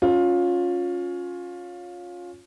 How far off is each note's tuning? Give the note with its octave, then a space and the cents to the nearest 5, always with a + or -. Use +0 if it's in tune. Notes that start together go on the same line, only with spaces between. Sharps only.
C#4 +5 F4 +20